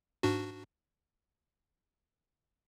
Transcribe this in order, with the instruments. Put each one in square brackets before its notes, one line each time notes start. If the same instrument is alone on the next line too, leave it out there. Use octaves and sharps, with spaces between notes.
[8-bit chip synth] G#2 D4 F#4